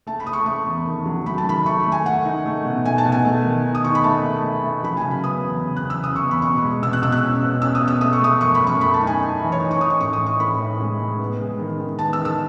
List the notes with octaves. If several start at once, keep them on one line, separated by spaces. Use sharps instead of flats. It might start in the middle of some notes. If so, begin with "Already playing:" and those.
A3 A5
B5
A3 D#6
C#6
A3 C#6
E2
D#3
F#3
A3 B5
A5
D#3 B5
A3 C#6
A3
G#5
A3 F#5
D#4
A3
B2
A3 G#5
A5
B2
G#5
A3
D#3
D#4
D#6
D#4 C#6
B5
A3 A5
A3
A3
A3
F#3 B5
G#5
C#3
B5
B3 D#6
E2
C#3
F#6
E2
E6
C#3 D#6
C#6
E2
B5
B2 C#6
G#3
B2 E6
F#6
B2 E6
F#6
C#4
B2
C#4 E6
D#6
B2
E6
A3 D#6
C#6
A3 D#6
F#2 C#6
B5
F#2
C#6
A3 B5
A5
D#4
G#5
D#4
E3
C#5
D#4 D#5
C#6
D#4 D#6
C#6
A2 C#6
D#6
D#4
C#6
A2 B5
A2
G#3
G#3
B3
G#3
D#3
D#3
B3 A5
E6
D#3
E6